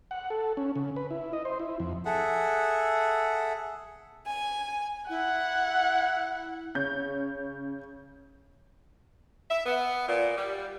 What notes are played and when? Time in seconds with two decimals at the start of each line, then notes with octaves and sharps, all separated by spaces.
0.11 F#5
0.30 A4
0.57 C#4
0.76 C#3
0.96 B4
1.10 E4
1.33 D#5
1.45 C5
1.59 E4
1.80 F2
2.05 G#4 A4 E5 F#5
4.26 G#5
5.09 E4 F#5
6.75 C#3 C#5 G6
9.50 E5
9.66 B3
10.08 A#2
10.37 G3